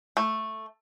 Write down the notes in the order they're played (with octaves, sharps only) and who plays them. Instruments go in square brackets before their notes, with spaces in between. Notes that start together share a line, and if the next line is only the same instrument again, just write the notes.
[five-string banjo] A3